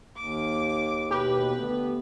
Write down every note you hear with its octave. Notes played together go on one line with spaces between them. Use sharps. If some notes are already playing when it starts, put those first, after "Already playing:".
D#2 D6
B2 G4 B4
D3 A3 B3